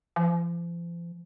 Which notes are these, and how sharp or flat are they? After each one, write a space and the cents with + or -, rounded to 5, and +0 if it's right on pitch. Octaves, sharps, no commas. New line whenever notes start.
F3 -40